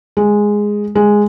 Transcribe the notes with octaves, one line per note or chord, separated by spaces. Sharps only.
G#3
G#3